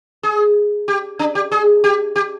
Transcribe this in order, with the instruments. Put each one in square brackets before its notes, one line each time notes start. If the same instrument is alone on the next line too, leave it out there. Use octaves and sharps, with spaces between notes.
[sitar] G#4
G4
D4
G4
G#4
G4
G4